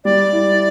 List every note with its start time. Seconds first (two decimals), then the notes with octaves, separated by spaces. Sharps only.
0.05 G3 D5
0.32 E4